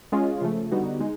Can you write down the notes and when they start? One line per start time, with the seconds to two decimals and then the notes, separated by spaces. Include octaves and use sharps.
0.12 G#3 C#4 F4 G#4
0.41 C#3 F3 A3
0.72 D3 G3 B3 D#4 F#4
1.00 G#3 D#4